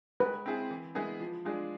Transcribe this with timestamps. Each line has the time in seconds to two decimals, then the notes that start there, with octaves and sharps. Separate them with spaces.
0.20 G#3 B4
0.46 C4 E4 G#4
0.70 E3
0.95 G#3 B3 E4 G#4
1.20 F3
1.45 G#3 D4 F4 G#4